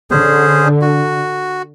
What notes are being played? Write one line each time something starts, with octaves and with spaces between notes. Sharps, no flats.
D3 C#4 G#4 C5
F#4